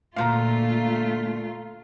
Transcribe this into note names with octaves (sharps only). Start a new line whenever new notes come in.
D2 A#2 A3 F4 F5 A#5